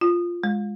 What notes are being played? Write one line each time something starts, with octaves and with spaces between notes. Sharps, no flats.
F4
G#3